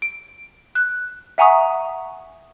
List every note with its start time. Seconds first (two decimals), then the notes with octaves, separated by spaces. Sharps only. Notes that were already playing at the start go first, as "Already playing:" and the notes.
0.02 D7
0.75 F#6
1.38 E5 F#5 G#5 A#5 C#6 D#6